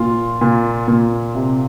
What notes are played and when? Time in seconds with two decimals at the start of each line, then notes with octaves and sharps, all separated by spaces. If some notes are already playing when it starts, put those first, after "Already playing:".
Already playing: A#2 F4
0.41 A#2
0.88 A#2
1.35 C3